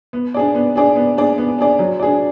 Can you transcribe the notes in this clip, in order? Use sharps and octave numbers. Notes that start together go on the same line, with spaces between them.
B3
D4 G#4 D5
B3
D4 G#4 D5
B3
D4 G#4 D5
B3
D4 G#4 D5
F#3
D4 G#4 D5